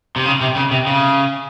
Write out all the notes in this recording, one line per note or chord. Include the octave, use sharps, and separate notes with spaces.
C3
C#3
C3
C#3
C3
C#3